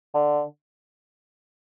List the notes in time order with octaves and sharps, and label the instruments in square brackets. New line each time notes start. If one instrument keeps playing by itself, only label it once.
[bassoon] D3